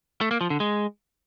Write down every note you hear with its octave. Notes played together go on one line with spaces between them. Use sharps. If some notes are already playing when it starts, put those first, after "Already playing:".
A3
A#3
F3
D3
G#3